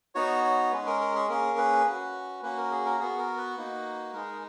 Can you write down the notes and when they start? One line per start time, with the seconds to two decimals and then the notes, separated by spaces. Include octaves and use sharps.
0.15 B3 D#4 F#4 C#5
0.44 C#5
0.72 G#3 C#4 G#4 B4
0.86 A#4
1.01 A#4
1.15 G#4
1.29 A#3 C#4 G#4 A#4
1.58 B4
1.86 C#4 F#4
2.43 A#3 C#4 F#4 B4
2.57 A#4
2.71 G#4
2.85 A#4
3.00 B3 F#4 G#4
3.18 A#4
3.38 B4
3.56 A#3 D#4 F#4
4.13 G#3 D#4 G#4 A#4